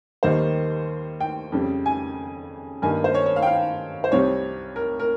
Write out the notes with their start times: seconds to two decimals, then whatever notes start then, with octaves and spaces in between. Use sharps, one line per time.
0.23 D#2 D#3 G3 A#3 C5
1.20 G5
1.52 F2 C#3 G3
1.86 G#5
2.82 G2 D#3 A#3 G#5
3.04 C5
3.14 C#5
3.26 C#5
3.36 F5
3.43 G5
3.46 F5
4.04 C5
4.12 C2 C3 G3 C4 C#5
4.76 A#4
5.00 A#4